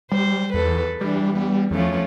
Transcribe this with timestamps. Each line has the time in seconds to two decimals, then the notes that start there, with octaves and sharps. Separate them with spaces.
0.12 G3 C5
0.54 E2 A4 B4
1.01 E3 G3 D4
1.35 G3 B3
1.71 E2 F3 A3 C#4